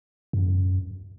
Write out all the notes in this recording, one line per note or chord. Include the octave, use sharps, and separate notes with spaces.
F#2